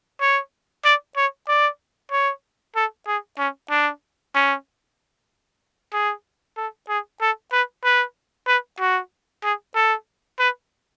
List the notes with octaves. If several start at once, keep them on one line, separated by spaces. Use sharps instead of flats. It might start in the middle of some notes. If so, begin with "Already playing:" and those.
C#5
D5
C#5
D5
C#5
A4
G#4
C#4
D4
C#4
G#4
A4
G#4
A4
B4
B4
B4
F#4
G#4
A4
B4